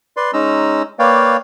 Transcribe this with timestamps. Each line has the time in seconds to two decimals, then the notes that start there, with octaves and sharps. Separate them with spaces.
0.17 B4 D5 C6
0.33 G#3 C#4 D#4 A#5 E6
0.99 A#3 B4 C#5 D5 F5 G5